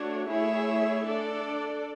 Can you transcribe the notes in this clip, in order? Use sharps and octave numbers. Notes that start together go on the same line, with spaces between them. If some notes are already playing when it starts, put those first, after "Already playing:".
Already playing: A3 D4 F#4 C#5
A3 E4 G#4 C#5 E5
D4 A4 D5